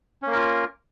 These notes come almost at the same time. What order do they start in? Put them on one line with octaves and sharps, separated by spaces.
C#4 A#3 A#4 F4